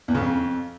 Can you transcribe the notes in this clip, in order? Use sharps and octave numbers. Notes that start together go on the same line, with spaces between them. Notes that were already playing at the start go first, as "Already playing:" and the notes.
E2
C#3
F2